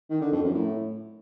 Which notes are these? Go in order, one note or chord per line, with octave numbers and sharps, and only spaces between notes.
D#3
D3
F2
F#2
A2